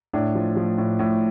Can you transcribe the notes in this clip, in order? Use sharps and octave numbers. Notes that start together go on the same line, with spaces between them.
A2 D4
F3
F3
A2
A2